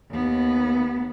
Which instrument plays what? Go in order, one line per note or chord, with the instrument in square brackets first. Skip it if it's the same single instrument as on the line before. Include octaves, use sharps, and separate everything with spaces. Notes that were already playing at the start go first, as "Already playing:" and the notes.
[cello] D#2 B3